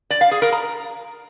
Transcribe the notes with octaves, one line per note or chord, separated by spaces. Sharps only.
D5
F5
G#4
A#4
A#5